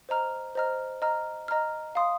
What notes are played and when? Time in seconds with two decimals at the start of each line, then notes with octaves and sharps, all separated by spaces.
0.09 C5 D#5 A#5 F6
0.55 C5 D#5 A#5 F6
1.02 D#5 A#5 F6
1.48 D#5 A#5 F6
1.95 F5 C6 D#6